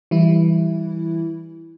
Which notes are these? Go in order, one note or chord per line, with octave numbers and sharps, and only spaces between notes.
E3 G3 E4